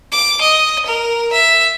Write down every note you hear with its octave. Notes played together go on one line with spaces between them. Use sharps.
D6
D#5
A#4
E5